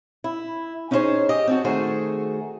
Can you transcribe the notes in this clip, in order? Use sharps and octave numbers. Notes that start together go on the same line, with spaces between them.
E4
C#4 D#4 E4 G#4 C5 C#5
G4 D#5
C4 D4 F#4
D#3 A3 F#4 G#4 C5